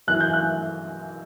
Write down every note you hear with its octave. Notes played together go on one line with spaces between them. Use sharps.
F#2 E3 F#6
G6
F#6